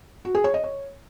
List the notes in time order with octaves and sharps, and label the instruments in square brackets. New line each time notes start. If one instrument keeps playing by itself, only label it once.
[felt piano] F#4
G#4
C#5
D#5
C#5